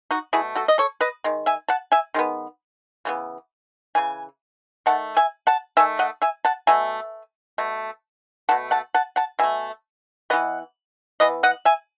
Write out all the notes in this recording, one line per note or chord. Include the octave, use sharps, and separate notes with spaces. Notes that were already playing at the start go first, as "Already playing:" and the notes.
D#4 F#4
B2 A3 E4 G#4
F#4 A4
D#5
A4 C#5
B4 D#5
D#3 G#3
E5 G#5
F#5 A5
E5 G#5
D#3 G#3 B3
C#3 E3 B3
C#3 E3 G#5
D#3 A3 F#5 A5
E5 G#5
F#5 A5
D#3 A3 E5 G#5
D#5 F#5
E5 G#5
F#5 A5
B2 A3 E5 G#5
B2 A3
B2 A3 F#5 A5
F#5 A5
F#5 A5
F#5 A5
B2 A3 E5 G#5
E3 B3 D#5 F#5
E3 B3 B4 D#5
D#5 F#5
E5 G#5